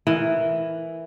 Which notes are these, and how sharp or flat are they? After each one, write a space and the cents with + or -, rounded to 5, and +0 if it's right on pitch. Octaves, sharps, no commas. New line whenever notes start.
E3 +0 A#4 +0